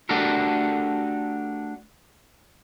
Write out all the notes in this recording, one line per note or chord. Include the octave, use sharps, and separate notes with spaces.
A3 D4 F#4 G4 A4 A#4